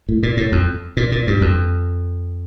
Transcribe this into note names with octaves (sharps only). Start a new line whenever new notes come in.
A2
A#2
A2
F2
A#2
A#2
G2
F2